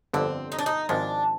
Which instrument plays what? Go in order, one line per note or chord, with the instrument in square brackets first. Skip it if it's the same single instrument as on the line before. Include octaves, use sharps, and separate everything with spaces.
[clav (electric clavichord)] G1 F2 D3 [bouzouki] C4
[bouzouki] D#4
D4
D#4
[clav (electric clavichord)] G#1 G#2 F3 G#3 [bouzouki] D4